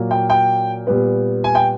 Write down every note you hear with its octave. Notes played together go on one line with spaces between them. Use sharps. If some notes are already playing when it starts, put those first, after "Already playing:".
Already playing: A#2 F#3 A#3
G5
G5
A#2 G3 B3
G#5
G5